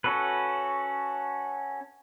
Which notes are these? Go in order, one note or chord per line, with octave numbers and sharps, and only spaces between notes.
C#4 F#4 A4 B4